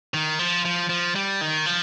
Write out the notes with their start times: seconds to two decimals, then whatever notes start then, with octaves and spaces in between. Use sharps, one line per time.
0.14 D#3
0.39 F3
0.65 F3
0.89 F3
1.16 G3
1.41 D#3
1.66 F3